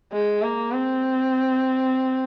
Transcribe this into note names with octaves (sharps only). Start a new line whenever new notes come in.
G#3
A#3
C4